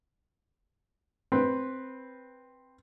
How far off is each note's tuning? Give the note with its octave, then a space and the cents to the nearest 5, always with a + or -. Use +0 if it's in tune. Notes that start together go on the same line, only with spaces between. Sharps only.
C4 +0 B4 -5